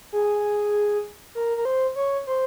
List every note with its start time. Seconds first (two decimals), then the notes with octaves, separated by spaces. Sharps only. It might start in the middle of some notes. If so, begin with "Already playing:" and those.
0.13 G#4
1.35 A#4
1.57 A#4
1.65 C5
1.96 C#5
2.27 C5